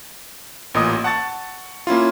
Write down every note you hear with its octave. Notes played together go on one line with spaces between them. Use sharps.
A1 A#2 D#5 D#6
F#5 A5 C#6 A6
A#3 C#4 E4 F4